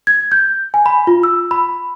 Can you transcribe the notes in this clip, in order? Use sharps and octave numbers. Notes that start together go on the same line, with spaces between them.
G#6
G6
G#5
B5
F4
E6
B5